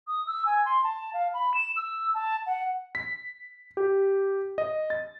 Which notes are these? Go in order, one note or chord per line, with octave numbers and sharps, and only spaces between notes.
D#6
E6
G#5
C6
A5
F5
B5
E7
E6
A5
F#5
B6
G4
D#5
A6